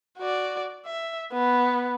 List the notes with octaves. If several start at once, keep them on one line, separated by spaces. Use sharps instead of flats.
F#4 D5
E5
B3